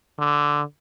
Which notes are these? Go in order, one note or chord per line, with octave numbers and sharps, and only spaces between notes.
D3